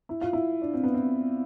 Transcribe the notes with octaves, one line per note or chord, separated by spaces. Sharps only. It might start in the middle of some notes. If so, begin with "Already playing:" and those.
E4
F4
E4
D4
C4
B3
C4